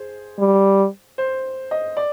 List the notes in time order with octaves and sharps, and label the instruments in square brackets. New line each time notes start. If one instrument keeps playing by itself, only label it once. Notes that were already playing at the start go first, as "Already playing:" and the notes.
Already playing: [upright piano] G#4 C5
[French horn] G3
[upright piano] C5
D#5
D5